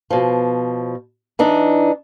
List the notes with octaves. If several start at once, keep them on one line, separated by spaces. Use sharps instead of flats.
B2 F3
E3 D4 D#4